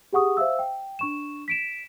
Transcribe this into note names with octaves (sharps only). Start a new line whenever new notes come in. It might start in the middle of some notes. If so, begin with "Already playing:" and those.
G4 G#4 F#5 C#6 D#6
C5 E5 F5 E6
G5
D4 C#6 E7
B6 D7 E7